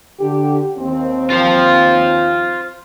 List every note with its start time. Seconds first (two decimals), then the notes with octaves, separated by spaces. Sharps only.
0.20 D3 G4
0.78 D#2 C4
1.30 F4 C5